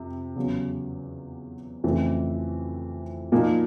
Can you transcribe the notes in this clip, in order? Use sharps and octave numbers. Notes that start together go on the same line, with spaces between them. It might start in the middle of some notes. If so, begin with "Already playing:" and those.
Already playing: F2 C3
E2 C#3 F#3
F2 C#3 E3 A3 C4
A#2 F3 A#3 D#4